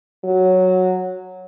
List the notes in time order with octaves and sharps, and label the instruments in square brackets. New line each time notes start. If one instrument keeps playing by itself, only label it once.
[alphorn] F#3